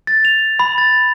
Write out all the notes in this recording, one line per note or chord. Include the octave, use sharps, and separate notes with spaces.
A6
F7
B5
A6